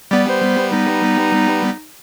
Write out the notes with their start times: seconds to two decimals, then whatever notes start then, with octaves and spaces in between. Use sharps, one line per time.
0.11 G3 B3 D5
0.28 C5
0.71 D#4